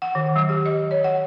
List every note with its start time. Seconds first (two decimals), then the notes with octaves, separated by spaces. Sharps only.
0.02 F#5
0.15 D#3
0.36 F#3
0.49 G4
0.66 D#5
0.91 C#5
1.04 F#5